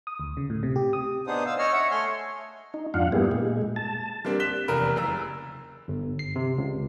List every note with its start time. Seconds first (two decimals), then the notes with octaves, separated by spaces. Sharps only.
0.07 D#6
0.20 D2
0.37 C#3
0.50 A2
0.63 C3
0.76 G4
0.93 D#6
1.27 B3 D4 D#4 G#4 C5 D#6
1.46 F5 E6
1.59 C#5 D#5 E6 F6
1.73 C#5 E5 F#5
1.91 A3 G#5 C6 F6
2.74 D#4
2.94 F2 G#2 D4 F4 F5 F#5
3.12 G3 A#3 B3 E4 G4 G#4
3.31 A#2 G#3
3.76 A5
4.25 G3 A#3 C4 D4
4.40 F#6 B6 E7 G7
4.68 F1 E2 A#4 B5
4.96 F#1 A#5 E6
5.88 G1
6.19 C7
6.36 C3
6.58 C#2